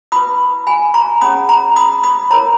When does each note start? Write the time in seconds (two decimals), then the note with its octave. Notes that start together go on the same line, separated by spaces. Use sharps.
0.12 E4 B4 B5 D#6
0.67 G#5 B5
0.94 A#5 C#6
1.21 C#4 G#4 C#5 B5 D#6
1.49 A#5 C#6
1.76 B5 D#6
2.03 B5 D#6
2.30 E4 A#4 C#5 A#5 C#6